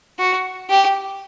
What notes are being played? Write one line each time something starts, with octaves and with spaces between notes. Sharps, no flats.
F#4
G4